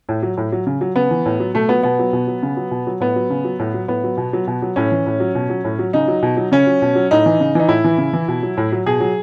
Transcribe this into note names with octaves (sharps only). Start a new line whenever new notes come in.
A2
F#3
A2
F#3
C#3
F#3
C#3 B3
E3
A2
F#3
B2 A3
F#3 B3
B2 B3
F#3
B2
F#3
C#3
F#3
B2
F#3
A2 B3
F#3
C#3
F#3
A2
F#3
A2 B3
F#3
B2
F#3
B2
F#3
A2 C#4
E3
A2
F#3
B2
F#3
A2
F#3
C#3 D#4
F#3
B2
F#3
C#3 C#4
F#3
B2
F#3
A2 D#4
E3
C#3
E3 D#4
A2 E4
E3
C#3
E3
B2
F#3
A2
F#3
B2 G#4
F#3